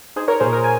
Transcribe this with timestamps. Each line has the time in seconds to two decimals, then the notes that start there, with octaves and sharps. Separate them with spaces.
0.16 D#4 G#4 C5
0.28 A#4 C#5
0.40 A#2 G#4 C5
0.53 A#4
0.64 G#5